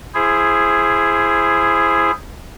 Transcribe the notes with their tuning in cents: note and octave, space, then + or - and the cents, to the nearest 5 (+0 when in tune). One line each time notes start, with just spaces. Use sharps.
E4 +20 G#4 +0 C5 +0